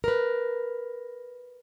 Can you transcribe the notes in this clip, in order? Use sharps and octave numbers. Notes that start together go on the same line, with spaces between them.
A#4 B4